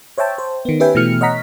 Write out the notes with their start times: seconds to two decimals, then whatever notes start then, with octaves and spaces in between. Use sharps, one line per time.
0.18 C5 C#5 E5 G5 A5
0.38 C5
0.65 D#3 B3
0.80 C#4 G4 B4 E5 G5 G#5
0.95 B2 E3 A3 F6 C#7
1.21 C#5 D#5 F#5 A#5 B6